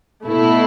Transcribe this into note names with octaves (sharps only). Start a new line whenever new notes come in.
B2 A3 E4